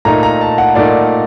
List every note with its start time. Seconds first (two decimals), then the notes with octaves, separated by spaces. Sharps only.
0.05 A#2 A3 D#4 A#5
0.23 A#5
0.41 A5
0.58 F#5
0.75 A#2 A3 D#4 D5